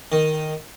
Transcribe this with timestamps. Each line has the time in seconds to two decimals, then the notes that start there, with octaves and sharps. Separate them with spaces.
0.12 D#3